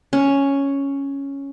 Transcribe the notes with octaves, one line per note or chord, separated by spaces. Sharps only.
C#4